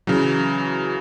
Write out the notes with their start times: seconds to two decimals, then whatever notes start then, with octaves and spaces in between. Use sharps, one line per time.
0.07 C#3 E3 F#3